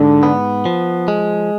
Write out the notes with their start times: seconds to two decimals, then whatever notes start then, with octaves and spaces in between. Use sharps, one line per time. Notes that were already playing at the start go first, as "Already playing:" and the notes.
Already playing: G#2 D3
0.23 B3
0.66 F3
1.08 G#3